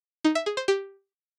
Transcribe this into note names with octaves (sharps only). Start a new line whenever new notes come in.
D#4
E5
G#4
C5
G4